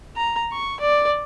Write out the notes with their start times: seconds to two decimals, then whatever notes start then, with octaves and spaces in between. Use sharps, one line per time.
0.16 A#5
0.52 C#6
0.80 D5